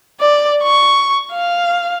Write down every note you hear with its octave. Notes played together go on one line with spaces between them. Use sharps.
D5
C#6
F5